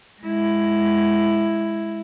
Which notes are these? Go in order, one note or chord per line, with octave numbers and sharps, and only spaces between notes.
G#3 E4